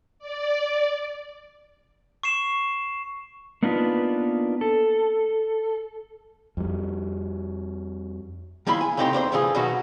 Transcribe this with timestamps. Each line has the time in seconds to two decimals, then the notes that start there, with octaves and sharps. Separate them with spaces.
0.19 D5
2.23 C#6 C7 E7
3.63 A#3 B3 D4 D#4 F4 B4
4.61 A4
6.57 F2 G3
8.67 D#3 F3 A#3 E4 B5 C6
8.81 G#5
8.97 A2 C#3 C4 D#4 G4 C6
9.13 F2 D4 C5 C6
9.32 A2 E3 F3 F4 G#4
9.54 B2 D#3 F#3 B3 D#4 F#4